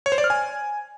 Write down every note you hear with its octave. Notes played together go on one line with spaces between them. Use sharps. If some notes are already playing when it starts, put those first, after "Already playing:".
C#5
C5
D5
F6
G#5